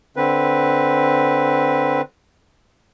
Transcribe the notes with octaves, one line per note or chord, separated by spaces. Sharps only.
D3 C4 B4